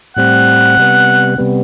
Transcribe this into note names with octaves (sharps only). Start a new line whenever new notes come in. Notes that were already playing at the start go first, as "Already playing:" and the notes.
A2 G3 C4 F#5
C3 G3 B3
C3 G3 B3